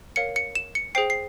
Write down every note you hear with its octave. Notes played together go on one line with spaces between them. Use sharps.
A#4 C#5 F5 C#7
C#7
E7
C#7
G#4 C5 G5 C7
C7